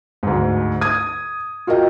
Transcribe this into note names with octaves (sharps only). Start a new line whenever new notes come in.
D2 G#2
D#6 G#6
F4 F#4 A#4 D#5 G5